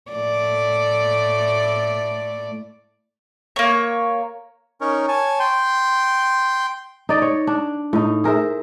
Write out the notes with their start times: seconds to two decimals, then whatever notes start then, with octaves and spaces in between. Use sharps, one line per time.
0.12 A2 A3 D5
3.56 A#3 C#5
4.81 C#4 D#4 A#4 C#5
5.08 C#5 G#5 A5
5.40 G5 C6
7.09 D#4 D5 D#5
7.22 C#5
7.47 D4
7.93 A2 D#4
8.24 G#4 A#4 C5 E5